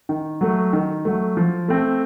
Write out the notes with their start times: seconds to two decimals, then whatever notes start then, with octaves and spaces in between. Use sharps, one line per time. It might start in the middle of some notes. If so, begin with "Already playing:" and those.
0.09 D#3
0.41 F#3 A3
0.73 D#3
1.05 F#3 A3
1.37 F3
1.68 A3 C4